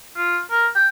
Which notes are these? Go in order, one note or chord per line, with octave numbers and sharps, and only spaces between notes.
F4
A#4
G5